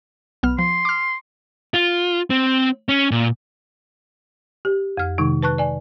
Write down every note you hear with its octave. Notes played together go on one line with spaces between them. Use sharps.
B1 B3 F6
F3 C6
D6 F6
F4
C4
C#4
A#2
G4
F2 F6
C3 D#3 G#3 D#4
B4 A5 C#6 F#6
D5 G#5